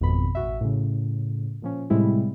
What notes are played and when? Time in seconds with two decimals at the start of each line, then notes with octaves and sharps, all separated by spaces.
0.01 G#1 F2 B2 B5
0.35 A1 F#4 E5
0.61 A2 C#3
1.62 A#2 F3 C#4
1.90 A2 C3 G3 G#3 C4 E4